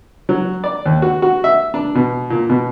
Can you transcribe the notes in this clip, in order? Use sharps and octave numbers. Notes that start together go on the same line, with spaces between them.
F#3
D5
D#2
F#4
F#4
E5
D4
B2
A#2
B2